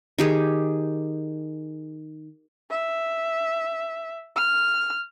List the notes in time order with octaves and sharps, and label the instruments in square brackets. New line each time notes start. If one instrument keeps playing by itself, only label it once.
[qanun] D#3 G4 G#4
[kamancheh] E5
F6